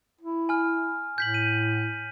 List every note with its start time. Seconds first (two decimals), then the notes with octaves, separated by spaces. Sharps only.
0.21 E4
0.49 G#5 F6
1.18 A2 G6 B6 F#7
1.34 D#7